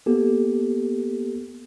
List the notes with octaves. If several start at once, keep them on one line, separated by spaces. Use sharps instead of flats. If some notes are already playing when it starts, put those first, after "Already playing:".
A#3 B3 G4 A4